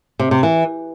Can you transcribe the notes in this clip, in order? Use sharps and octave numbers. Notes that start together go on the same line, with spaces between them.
C3
C3
E3